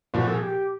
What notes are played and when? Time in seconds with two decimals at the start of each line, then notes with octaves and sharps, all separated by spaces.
0.14 C2 A#2 F3 F#4
0.28 A4
0.34 G#4
0.42 G4